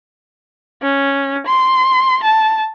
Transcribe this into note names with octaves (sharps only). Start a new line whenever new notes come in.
C#4
C6
A5